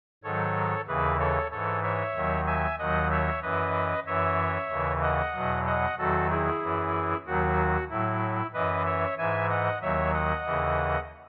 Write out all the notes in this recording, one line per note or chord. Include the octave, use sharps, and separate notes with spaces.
G#2 D#3 F#3 A4 C#5
D#2 C#3 E3 G#4 B4
A4 C#5
G#2 E3 A4 C#5
C#5 E5
D#2 D#3 F#3
E5 G#5
D#2 D#3 F#3 D#5 F#5
C#5 E5
F#2 E3 B4 D#5
F#2 E3 C#5 E5
D#2 C#3 E3
D#5 F#5
E2 B2 F#3
D#5 F#5
E2 D#3 F#3 F#4 A4
E4 G#4
F#2 E3
D#2 D#3 F#3 F#4
A2 F#3 E4
F#2 E3 B4 D#5
C#5 E5
G#2 E3 E5 G#5
D#5 F#5
D#2 D#3 F#3 C#5 E5
D#5 F#5
D#2 C#3 E3